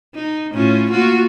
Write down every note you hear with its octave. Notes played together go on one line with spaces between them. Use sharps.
D#4
A2 C#4 F4
A#3 F4 F#4